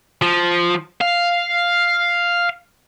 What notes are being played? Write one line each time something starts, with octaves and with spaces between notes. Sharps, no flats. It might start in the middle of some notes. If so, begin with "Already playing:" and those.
F3
F5